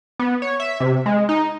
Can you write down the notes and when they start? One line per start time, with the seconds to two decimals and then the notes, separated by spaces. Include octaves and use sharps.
0.19 B3
0.42 C#5
0.60 E5
0.80 C3
1.06 G#3
1.29 D#4